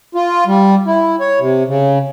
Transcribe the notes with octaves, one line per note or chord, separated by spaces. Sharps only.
F4
G3
E4
C#5
C3
C#3